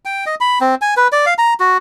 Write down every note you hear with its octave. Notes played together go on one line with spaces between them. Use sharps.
G5
D#5
B5
C4
G#5
B4
D5
F5
A#5
F#4